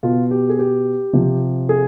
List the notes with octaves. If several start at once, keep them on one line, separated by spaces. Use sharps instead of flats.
B2 F4
G4
G#4
G4
C3 F3
G#4